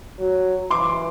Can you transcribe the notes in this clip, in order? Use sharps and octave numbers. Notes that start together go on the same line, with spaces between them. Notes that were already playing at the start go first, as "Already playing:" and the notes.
F#3
E3 C6 D6